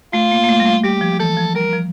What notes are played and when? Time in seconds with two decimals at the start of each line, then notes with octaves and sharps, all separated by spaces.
0.13 A3 F4
0.31 A#3
0.44 A#3
0.49 A3
0.60 G3
0.66 A3
0.83 G3 G4
1.01 F3
1.12 F3
1.19 E3 A4
1.37 F3
1.55 G3 A#4
1.73 F3